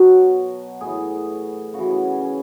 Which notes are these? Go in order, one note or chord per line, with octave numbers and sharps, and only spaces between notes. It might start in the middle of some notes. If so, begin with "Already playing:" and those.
Already playing: B2 F#3 F#4
A2 E3 G#4
C#3 E3 F#4
B3
C#4
C#4